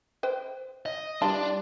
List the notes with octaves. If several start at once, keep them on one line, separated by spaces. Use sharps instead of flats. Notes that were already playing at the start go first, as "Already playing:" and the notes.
B4 C5 G5
D#5
E3 G3 D4 F4 A5